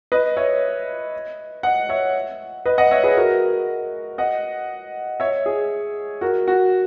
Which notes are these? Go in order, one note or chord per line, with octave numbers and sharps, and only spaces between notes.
B4 D#5
C#5 E5
D#5 F#5
C#5 E5
B4 D#5
D#5 F#5
C#5 E5
G#4 B4
F#4 A#4
D#5 F#5
C#5 E5
G#4
F#4 A#4
F#4